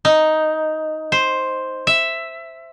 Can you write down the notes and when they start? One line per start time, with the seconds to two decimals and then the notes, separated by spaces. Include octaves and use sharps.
0.05 D#4
1.12 C5
1.87 E5